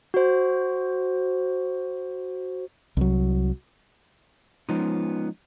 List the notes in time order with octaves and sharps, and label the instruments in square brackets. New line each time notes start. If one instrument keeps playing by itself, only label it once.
[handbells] F#4 C5
[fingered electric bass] C2 F#3
[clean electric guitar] F3 G#3 B3 C#4 D#4 F4